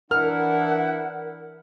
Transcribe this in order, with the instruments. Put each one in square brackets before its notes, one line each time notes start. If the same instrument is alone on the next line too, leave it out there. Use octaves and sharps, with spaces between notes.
[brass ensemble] E3 D4 E4 [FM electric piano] A#4 [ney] F#5 [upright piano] F6